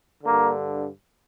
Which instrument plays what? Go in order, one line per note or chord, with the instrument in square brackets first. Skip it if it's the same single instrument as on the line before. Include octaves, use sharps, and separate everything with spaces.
[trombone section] G2 D3 A#3